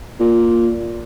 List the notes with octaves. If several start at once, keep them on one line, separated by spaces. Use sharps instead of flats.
A#2